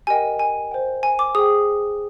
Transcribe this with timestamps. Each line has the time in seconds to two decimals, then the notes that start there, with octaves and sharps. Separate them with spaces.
0.07 G4 A#4 D#5 G5 G#5
0.39 G#5
0.71 C5 G5
1.03 G#5
1.19 D6
1.35 G#4 C5 G5 D#6